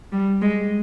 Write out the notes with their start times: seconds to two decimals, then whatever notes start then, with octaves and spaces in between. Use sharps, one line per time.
0.12 G3
0.42 G#3